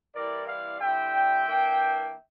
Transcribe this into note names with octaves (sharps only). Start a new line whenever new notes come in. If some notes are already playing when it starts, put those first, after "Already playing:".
E3 G3 C4 E4 A#4 D5
D5 F5
D3 G3 C4 E4 E5 G5
E3 A#3 D4